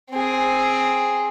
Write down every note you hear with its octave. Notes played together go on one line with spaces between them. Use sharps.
C4 G#4